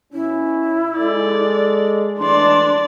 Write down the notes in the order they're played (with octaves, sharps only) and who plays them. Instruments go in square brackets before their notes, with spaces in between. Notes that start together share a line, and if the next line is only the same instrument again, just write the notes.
[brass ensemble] B2 C#4 [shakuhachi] E4
[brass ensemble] G#3 A4 [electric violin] D5
[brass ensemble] E3 G#3 A3 [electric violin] D4 D5 [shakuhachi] C6